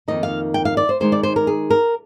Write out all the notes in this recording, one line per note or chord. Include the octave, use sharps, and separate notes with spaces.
F2 D#3 A#3 D#4 D#5
F5
G5
F5
D5
C5
D#3 G#3 D#4 C5
D5
C5
A#4
G#4
A#4